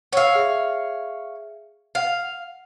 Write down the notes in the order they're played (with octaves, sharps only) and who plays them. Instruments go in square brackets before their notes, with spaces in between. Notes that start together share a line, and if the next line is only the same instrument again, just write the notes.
[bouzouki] C#5 F5 [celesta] F#5 E6
[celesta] G#4 E5
[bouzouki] F5 [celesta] F#5